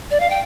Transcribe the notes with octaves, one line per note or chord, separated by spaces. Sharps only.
D5
F5
G5